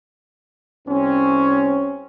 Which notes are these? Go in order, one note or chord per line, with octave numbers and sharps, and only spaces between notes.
C2 C4 C#4